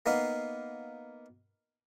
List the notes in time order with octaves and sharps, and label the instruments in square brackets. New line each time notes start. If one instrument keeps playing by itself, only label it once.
[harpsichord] A#3 B3 D#4 F5